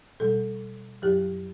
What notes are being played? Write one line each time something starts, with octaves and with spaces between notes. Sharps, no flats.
B2 G3 A4
F#2 F#3 G4